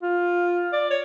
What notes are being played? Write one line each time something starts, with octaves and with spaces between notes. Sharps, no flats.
F4
D5
C#5